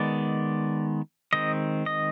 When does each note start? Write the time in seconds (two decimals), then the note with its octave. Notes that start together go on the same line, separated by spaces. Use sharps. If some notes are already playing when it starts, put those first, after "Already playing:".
Already playing: D#3 G#3 B3 D5
1.33 D#3 G#3 C4 D#5
1.86 D#5